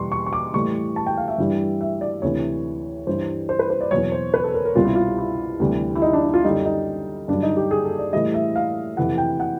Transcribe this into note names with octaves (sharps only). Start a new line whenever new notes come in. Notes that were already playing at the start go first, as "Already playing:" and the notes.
Already playing: E2 B2 G3 C6 C#6
C#6
C#6
D6
A2 E3 G3 C#6
A5
G5
F5
E5
G2 E3 G3
E5
D5
D2 C3 E3 C#5
G2 E3 G3 C5
C5
B4
C5
D5
E2 B2 F#3 C#5
C5
B4
A4
A#4
A#4
C2 B2 G3 F4
E4
F4
E4
D2 C3 E3 G3
E4
D#4
D4
D#4
F4
F#2 D3 G3 D#4
D#4
G2 D3 F#3 D4
D#4
G4
G#4
A4
D5
A2 E3 G3 D#5
E5
F5
F2 C3 E3 F#5
G5
F#5